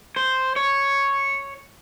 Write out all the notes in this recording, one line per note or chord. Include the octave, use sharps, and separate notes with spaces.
C5
C#5